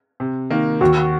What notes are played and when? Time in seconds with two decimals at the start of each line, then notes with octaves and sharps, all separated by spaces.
0.20 C3
0.50 D#3 A#3
0.81 D#2 F#4